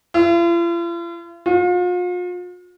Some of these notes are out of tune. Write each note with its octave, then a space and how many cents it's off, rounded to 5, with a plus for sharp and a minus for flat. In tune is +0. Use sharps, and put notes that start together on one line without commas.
F4 -45
F4 +40